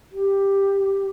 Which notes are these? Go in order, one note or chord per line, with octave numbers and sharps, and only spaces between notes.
G4